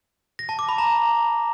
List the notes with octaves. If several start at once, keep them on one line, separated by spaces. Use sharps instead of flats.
A#6
A5
D6
B5
A#5